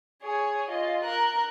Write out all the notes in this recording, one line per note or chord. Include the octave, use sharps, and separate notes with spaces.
G#4 C#5
F4 D#5
A#4 F#6